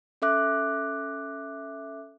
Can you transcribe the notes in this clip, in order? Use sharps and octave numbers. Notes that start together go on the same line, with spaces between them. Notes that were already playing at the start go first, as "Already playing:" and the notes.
C#4 A4 E5 D6 F#6